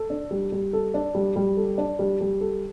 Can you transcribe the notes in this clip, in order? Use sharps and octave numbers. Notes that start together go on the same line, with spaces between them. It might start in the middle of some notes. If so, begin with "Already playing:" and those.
Already playing: A4
D4
G3
G3
A4
D4
G3
G3
A4
D4
G3
G3
A4